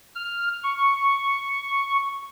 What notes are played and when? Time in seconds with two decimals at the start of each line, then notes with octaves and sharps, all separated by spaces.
0.16 F6
0.64 C#6